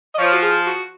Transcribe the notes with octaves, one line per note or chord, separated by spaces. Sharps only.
D#5
F3 C#5
F#4
G#4
F#4